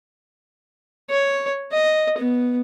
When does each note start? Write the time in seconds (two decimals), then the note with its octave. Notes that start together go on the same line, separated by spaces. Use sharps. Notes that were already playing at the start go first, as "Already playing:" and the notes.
1.10 C#5
1.72 D#5
2.18 B3